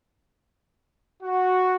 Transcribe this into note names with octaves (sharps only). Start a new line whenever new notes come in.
F#4